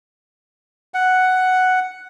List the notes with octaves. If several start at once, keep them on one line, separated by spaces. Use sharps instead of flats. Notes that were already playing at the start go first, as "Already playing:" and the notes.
F#5